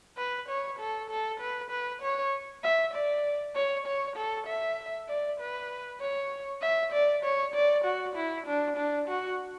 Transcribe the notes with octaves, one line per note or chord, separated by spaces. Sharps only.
B4
C#5
A4
A4
B4
B4
C#5
E5
D5
C#5
C#5
A4
E5
D5
B4
C#5
E5
D5
C#5
D5
F#4
E4
D4
D4
F#4